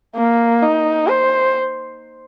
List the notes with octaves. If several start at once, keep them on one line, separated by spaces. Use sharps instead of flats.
A#3
D#4
C5